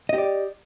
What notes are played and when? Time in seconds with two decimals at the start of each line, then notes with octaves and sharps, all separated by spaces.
0.09 D#5
0.14 G4
0.18 D5